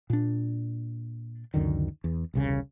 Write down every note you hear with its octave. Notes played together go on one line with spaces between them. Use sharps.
A#2 D4
C#2 F#2 D3 D#3
E2
E1 C2 C#3